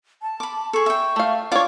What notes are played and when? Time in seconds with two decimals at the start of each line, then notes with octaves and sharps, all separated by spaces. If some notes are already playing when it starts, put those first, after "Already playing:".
0.22 A5
0.40 B5 D6
0.73 G#4 A4 C#6
0.86 E5 G5
1.16 A3 F5
1.52 D4 F4 C#5 D6